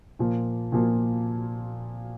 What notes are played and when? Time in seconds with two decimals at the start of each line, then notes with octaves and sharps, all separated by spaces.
0.19 A#2 F3 A#3
0.72 A#2 F3 A#3